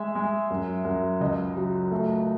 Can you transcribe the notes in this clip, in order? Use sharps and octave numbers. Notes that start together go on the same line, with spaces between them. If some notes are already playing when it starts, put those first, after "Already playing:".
Already playing: G#3 E5
G#3
F#2
F#2
C#2 D#5
F#3
A3